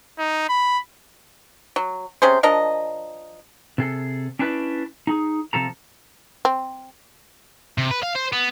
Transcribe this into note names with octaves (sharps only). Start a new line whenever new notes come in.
D#4
B5
F#3
C3 C#4 G#4 C5
F3 D4 A#4 D#5
C3 G#4 A4
C#4 D4 E4 B4 C#5 D5
D#4 G#4
C3 F3 A4 A#5
C4
C3
B4
F5
C5
B3